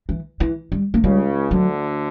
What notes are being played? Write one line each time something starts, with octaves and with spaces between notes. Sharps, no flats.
E3
E3
G3
A#3
C#2 C#3 G3
D2 D3 F#3